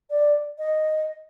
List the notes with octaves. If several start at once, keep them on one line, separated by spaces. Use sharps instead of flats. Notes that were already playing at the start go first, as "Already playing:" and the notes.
D5
D#5